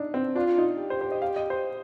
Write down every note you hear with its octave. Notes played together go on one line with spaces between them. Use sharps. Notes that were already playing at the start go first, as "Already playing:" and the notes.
Already playing: D4 D#4
C4
D4 F4
D#4
G4
C5
C5
D#5
F5
D#5
C5